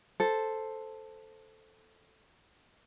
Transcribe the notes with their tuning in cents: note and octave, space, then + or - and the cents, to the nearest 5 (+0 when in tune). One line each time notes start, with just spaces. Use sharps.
A4 +0 C5 +0